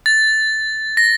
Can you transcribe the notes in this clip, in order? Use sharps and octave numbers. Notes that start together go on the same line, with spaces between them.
A6
A#6